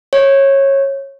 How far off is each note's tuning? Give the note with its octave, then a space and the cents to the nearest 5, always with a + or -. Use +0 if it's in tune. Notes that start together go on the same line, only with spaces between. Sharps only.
C#5 -20